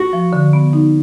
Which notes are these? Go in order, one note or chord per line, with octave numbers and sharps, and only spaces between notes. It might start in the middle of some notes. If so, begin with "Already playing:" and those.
Already playing: F#4
F3
D3
B3
D#4